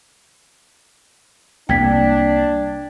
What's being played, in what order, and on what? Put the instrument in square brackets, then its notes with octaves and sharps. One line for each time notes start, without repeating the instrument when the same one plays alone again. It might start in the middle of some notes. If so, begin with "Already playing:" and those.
[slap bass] C2 A#3 [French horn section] D4 [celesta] G5 G#6 B6